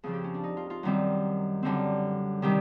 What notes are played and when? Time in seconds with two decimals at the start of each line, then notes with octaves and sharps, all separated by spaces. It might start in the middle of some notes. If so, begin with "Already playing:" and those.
0.03 F2 C#3 F3 G#4
0.13 G4
0.24 C#4
0.34 D4
0.43 D#4
0.57 F4
0.70 F4
0.83 F#2 D#3 G3 C4
1.63 F#2 D3 G3 C4
2.42 C3 D#3 G3 G4